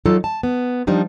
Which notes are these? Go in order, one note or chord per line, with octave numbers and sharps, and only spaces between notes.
F#3 D#4 F4 A4
A5
B3
F3 G3 D4 D#4